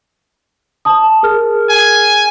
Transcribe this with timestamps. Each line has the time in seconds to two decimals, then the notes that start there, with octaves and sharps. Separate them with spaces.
0.85 A5 D#6
1.23 G#4 A#4 F6
1.69 G#5